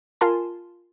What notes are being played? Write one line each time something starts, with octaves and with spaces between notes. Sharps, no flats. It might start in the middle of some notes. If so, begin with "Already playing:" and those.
F4 A#4 G#5 A5 C6